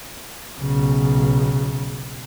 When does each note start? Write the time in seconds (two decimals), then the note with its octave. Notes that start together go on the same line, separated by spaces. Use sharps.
0.59 B1 C#3